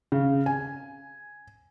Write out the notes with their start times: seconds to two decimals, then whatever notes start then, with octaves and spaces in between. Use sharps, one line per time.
0.12 C#3
0.46 G#5